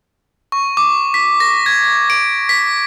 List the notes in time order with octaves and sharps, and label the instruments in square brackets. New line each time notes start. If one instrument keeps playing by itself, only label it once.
[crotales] C#6
D6
B6
A#6
G#6
D7
B6